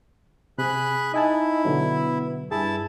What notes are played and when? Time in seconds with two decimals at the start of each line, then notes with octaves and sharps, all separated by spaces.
0.58 C3 G#4 B5 F#6
1.14 D#4 E4 D#5 G#5 A5
1.65 B2 D3 F#3 B3
2.51 G2 E4 G#4 A5